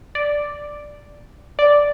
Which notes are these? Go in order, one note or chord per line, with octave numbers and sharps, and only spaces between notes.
D5
D5